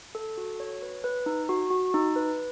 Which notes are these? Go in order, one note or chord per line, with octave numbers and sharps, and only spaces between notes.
A4
F#4
C#5
B4
B4
D#4
F#4
F#4
D#4
B4